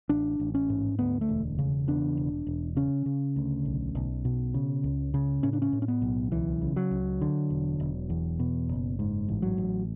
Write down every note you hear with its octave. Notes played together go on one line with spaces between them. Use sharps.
A1 D4
A1
C#4
G#2
D2 B3
A3
E1
C#3
E2 D4
E1
E1
C#3 C#4
C#3
D2
B1
B1
B2
C#3
C#2
C#3
A2 C#4
D4
C#4
A2
C#4
B3
B1
C#2 E3
C#3
F#3
C#2
D3
E1
E1
E2
B2
F#1
G#2
A1
F#3
A1